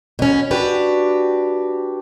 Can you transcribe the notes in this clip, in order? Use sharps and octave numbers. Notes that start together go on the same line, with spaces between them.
B2 C#4
D4 F#4 G4 B4